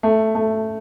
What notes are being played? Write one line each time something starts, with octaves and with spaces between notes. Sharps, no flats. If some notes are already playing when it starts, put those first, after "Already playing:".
A3
A3